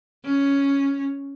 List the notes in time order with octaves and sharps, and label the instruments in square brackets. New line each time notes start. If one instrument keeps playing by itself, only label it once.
[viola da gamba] C#4